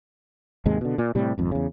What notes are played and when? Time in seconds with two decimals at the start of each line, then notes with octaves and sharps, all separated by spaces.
0.66 D#2 G#2 C3 G#3
0.81 B2 D3
0.98 A#2
1.15 A2 C3 G3
1.38 G#1 F2
1.51 E2 C#3